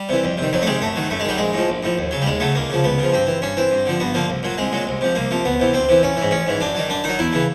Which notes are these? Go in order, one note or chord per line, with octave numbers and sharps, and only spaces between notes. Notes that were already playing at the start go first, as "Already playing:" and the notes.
Already playing: G3
C3 E3
F2
C3 D#3
F2 F#3
A3
C3 D#3 G#3
F#2 A3
D#3 F#3
F#2 A3
G#3
D#3 F#3 G3
A#1 G#3
A2 F3
A#1
A2 F3
D#2
C#3 F#3
G3
D#2 G#3
C#3 F#3 A3
C#2 A#3
C#3 F3
C#2 B3
C#3 F3
G2 C4
E3
G2 C#4
E3 C4
G2
D3 F3
G2 B3
D3 F3 A#3
C2
A#2 F#3
C2 G#3
A#2 F#3
C2
C3 F3
C2 A#3
C3 F3
D2 B3
C3 E3
D2 C4
C3 E3
A1 C#4
G#2 E3
A1 C#4
G#2 E3
F#2 D4
D#3 F#3
F#2 D4
D#3 F#3 D#4
E2 E4
C#3 E3